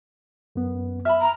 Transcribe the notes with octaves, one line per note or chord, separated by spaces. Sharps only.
F#2 B3
E5 A5 B5 F6
A#5